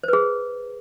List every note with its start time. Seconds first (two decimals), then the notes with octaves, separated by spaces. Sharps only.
0.04 C5
0.08 B4
0.13 G#4